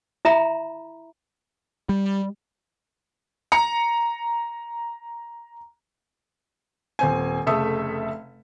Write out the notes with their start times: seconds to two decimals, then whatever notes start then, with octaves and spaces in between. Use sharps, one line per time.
0.25 E4 E5 A#5 B5
1.89 G3
3.52 A#5 C#7
6.99 D#1 C4 G#5
7.47 F1 C#3 A3 A4 E5 D#6